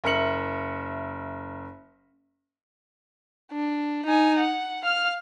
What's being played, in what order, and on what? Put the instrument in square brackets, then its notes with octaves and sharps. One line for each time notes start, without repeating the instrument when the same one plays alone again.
[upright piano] F#1 A#4 E5 C#7 F#7
[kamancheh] D4
D#4 G#5
F#5
F5 F6